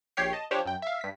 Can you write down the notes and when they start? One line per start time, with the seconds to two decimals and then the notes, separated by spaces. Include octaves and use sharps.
0.17 A#1 G4 C#5 G5 C7
0.33 D#5 A5
0.51 F3 D4 G4 C5 C#5
0.66 F#2 G5
0.82 E5 F5
1.01 G2 B6